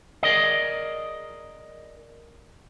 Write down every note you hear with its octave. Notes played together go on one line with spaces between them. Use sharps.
G#4 A#4 D5 D#5